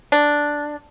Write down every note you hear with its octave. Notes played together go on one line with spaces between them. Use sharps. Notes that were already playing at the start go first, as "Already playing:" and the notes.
D4